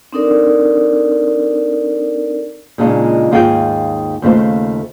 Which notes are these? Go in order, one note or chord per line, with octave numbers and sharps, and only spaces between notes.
C4 D4 D#4 A4 A#4 D5
A#2 C#3 G#3 D4 D#4 F4
D#2 G#2 F4 G#4 F5 G5
D#2 C#3 A3 F4 C5